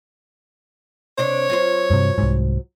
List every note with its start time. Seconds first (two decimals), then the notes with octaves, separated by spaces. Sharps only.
1.18 C3 D4 C5 C#5
1.49 F#3 F4 C5
1.90 G2 C3
2.18 C2 G#2